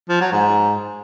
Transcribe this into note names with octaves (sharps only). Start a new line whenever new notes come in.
F3
F#3
G#2